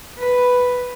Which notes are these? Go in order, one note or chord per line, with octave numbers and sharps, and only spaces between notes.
B4